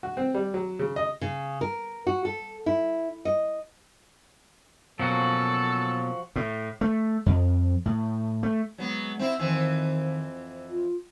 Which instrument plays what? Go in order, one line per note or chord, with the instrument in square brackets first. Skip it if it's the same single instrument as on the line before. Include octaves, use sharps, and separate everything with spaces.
[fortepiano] F#4
C4
G3
F#3
C#3
D#5
[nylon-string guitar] C#3
A#4
F#4
A4
E4
D#5
[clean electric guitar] B2 A#3 C#4 [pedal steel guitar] F3 F#4 [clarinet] F#3 [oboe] A4
[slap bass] A2
A3
F2
A2
A3
[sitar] F#3 B3 [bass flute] G#3
[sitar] C4 E4 [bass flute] E5
[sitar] F2 E3 C4 [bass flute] D#3
[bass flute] F4